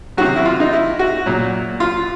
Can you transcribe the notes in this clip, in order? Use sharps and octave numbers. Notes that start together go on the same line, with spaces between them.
C3 D#3 F#3 F#4
E4
F4
D#4
E4
F#4
A#2 F#3
F4